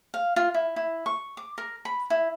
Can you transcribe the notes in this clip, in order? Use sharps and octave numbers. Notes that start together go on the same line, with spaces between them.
F5
F4
E4
E4
C#6
D6
A#4
B5
E4